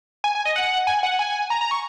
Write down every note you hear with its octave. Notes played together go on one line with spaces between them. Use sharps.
G#5
G#5
D#5
F#5
G#5
F#5
G#5
A#5
A#5
C#6